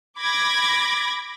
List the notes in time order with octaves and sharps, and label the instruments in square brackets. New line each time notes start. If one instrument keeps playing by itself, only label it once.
[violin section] B5 D6 G#6 A#6